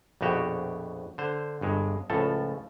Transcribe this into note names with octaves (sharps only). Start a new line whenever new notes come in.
A#1 F2 B2 F#4 G4 G5
D3 C5
G1 G2 G#3
C#2 A2 F3 A4